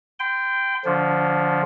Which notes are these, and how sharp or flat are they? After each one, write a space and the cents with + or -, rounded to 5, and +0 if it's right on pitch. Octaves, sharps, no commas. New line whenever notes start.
G5 +0 C6 -35
D3 +0 F3 +0 C#4 +45